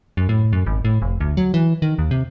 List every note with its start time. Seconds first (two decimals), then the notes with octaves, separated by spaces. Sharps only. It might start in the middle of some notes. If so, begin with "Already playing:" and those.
0.17 F#2
0.29 A2
0.53 F#2
0.66 G#1
0.85 A2
1.02 F1
1.20 D2
1.37 F#3
1.54 E3
1.82 D#3
1.99 D#2
2.11 C3